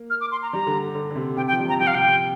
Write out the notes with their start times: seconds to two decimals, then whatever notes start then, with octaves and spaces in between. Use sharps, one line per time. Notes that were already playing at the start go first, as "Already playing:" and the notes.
Already playing: A#3
0.10 F6
0.21 D6
0.31 C6
0.42 A#5
0.53 G3 A#5
0.67 D3
0.95 D3
1.10 D3
1.16 C3
1.37 C3 G5
1.47 G5
1.51 F3
1.59 G3
1.66 F3 A#5
1.79 F3 G5
1.87 F5
1.94 C3 G5
2.07 C3